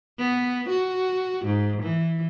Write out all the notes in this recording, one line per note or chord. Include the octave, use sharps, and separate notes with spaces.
B3
F#4
G#2
E3